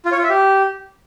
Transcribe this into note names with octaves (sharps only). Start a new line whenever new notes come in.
F4
C#5
F4
E5
G4